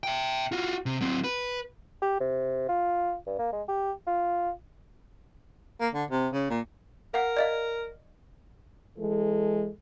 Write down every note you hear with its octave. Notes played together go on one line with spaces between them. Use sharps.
E5 G5
F4 F#4
C3
F#3 C4
B4
G4
C3
F4
G2
A#3
G#3
G4
F4
A#3
D3
C3
C#3
A#2
A#4 F5 F#5
D5 D#5 F5
E3 G#3 A4